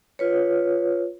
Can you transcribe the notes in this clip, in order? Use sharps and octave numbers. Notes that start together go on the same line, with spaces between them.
F4 B4 C#5